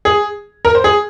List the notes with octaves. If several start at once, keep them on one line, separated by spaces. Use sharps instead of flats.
G#4
A#4
C5
G#4